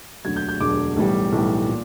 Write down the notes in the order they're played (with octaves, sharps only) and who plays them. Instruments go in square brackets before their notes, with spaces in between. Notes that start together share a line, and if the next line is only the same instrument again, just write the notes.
[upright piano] E1 D2 D3 F#3 G#6
G6
G6
E1 D2 D3 F#3 D6
B1 A2 E3 G3
B1 A2 E3 G3
A#2